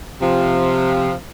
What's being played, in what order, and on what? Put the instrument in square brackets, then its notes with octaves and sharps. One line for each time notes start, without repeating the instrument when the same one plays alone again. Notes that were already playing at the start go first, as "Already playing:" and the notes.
[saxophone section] C3 F3